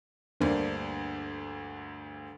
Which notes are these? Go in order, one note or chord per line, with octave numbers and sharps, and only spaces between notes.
D2 G2 A#3 D4 A#4 C5